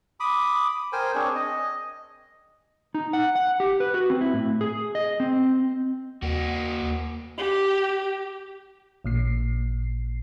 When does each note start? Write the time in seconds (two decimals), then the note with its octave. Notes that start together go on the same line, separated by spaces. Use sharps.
0.20 B5 D6 D#6
0.93 A#4 C5 G5 G#5
1.15 C4 D4 G#4 C#5
1.36 D#5
2.94 D#4
3.13 F#5
3.35 F#5
3.60 G4
3.80 B4
3.94 F#4
4.10 C4
4.21 E4
4.34 A2
4.61 G#4
4.95 D#5
5.20 C4
6.22 D#2 A#3 F#4
7.38 G4
9.04 A1 A#2 C7